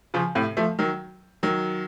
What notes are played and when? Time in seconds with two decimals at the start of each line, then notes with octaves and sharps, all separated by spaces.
0.14 C#3 F3
0.35 A2 C3
0.57 F3 A3
0.79 D#3 F#3
1.43 D#3 F#3